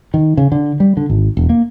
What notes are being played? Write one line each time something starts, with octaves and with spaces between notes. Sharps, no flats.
D#3
C#3
D3
G3
D3
G#1
E1
A#3